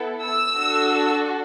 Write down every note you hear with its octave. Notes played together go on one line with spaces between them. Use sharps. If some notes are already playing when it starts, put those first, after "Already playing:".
Already playing: B3 E4 A4
E6
D4 F#4 A4